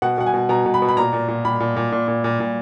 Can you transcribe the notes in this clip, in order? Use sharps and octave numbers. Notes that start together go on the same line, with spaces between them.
B2 F#5
B2 F#5
G#5
B2
B2 A#5
B2
B5
B2
B5
A#2 A#5
A#2
A#2
A#2 B5
A#2
A#2
A#2
A#2
A#2
A#2